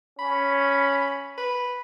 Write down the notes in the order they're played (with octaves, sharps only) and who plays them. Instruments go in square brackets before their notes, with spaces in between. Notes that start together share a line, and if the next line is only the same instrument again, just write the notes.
[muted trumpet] C#4 [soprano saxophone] B5
[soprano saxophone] B4